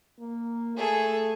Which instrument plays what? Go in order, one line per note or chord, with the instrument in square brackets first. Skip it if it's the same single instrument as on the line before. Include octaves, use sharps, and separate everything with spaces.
[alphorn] A#3
[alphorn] A3 [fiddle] G#4 A4